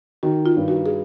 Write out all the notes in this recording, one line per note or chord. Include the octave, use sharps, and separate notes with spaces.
D#3 F#4
F4
G2
F#4
G#4